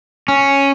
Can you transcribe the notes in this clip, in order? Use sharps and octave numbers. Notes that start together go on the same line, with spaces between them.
C#4